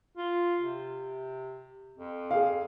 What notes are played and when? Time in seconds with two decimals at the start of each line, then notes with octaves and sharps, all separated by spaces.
0.17 F4
0.61 C3
1.97 F2
2.31 G#4 F5